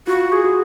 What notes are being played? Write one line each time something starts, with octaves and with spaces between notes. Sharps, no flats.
F4 F#4
G#4
F#4